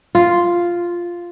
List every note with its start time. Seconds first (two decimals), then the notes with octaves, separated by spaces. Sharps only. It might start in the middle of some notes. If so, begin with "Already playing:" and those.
0.15 F4